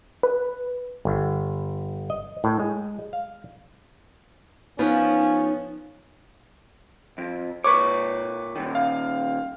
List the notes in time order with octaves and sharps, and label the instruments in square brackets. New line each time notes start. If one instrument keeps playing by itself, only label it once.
[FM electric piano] B4
[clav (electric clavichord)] G1
D#5
A2
G#3
F5
[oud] F3 [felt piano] B3 [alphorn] C#4 [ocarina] D#4
[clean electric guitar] F2
[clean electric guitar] A#2 C#5 [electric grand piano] B4 C#6 D6
[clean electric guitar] A#2 D#3
[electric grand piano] F5